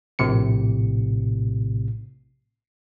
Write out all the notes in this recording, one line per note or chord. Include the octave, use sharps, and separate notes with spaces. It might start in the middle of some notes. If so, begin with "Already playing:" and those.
A#1 A2 C3 C#7